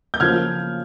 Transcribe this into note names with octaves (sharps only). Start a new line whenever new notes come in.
G6
C#3 F3 A#3 F6 G#6